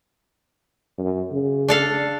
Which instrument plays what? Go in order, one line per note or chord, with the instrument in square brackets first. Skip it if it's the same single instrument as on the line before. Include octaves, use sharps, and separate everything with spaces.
[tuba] F#2
C#3
[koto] D4 A4 F5